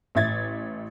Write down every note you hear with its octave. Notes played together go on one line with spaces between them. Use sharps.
A1 E5 G#6 A6